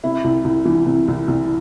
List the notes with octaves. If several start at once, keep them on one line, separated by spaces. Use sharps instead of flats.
C3 E4
C2
C2
E3
C3
C2
C2